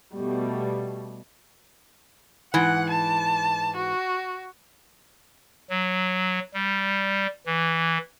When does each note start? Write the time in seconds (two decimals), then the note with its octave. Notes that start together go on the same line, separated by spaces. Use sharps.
0.15 B2 G3 A3
2.54 G#2 E3 F#5
2.91 A5
3.77 F#4
5.69 F#3
6.54 G3
7.46 E3